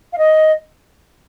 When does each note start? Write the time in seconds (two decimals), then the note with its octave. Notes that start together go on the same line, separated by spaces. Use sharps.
0.12 F5
0.18 D#5